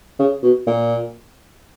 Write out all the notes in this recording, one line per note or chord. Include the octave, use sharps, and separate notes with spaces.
C#3
B2
A#2